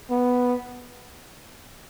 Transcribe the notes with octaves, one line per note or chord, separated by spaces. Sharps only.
B3